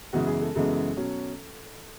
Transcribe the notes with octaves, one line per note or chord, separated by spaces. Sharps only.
F#2 C#3 E3 G#3 B3 F#4
G#4
A4
F#2 C#3 E3 G#3 B3 A4
B2 F#3 C#4